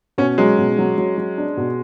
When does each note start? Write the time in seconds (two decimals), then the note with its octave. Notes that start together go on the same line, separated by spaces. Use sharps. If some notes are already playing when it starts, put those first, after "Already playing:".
0.18 B2 C#4
0.38 F#3 G#3
0.58 B2
0.78 F#3
0.98 F#3
1.18 F#3
1.38 D4
1.57 B2